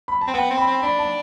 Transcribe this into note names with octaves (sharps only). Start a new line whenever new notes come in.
B5
A5
C4
B3 G5
C4
B5
C4
D4 B5
A5